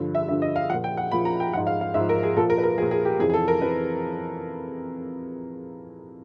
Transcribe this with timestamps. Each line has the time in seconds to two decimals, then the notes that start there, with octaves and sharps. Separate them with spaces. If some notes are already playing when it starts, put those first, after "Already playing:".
Already playing: G2 D3 F3
0.15 E5
0.28 G2 D3 F3 E5
0.42 D#5
0.56 F5
0.70 F3 F#5
0.74 A#2
0.84 G5
0.97 F#5
1.12 A#2 F3 B5
1.25 A#5
1.40 G5
1.53 G#2 F3 F#5
1.67 F5
1.81 F5
1.94 G#2 E5
2.00 F3
2.09 A#4
2.23 G#4
2.36 A#2 F3 A4
2.50 A#4
2.58 B4
2.64 A#4
2.77 F3 G#4
2.82 A#2
2.91 G#4
3.05 G4
3.19 F2 C3 E3 G#4
3.30 G#4
3.34 A4
3.48 A#4
3.61 F2 C3 E3 B4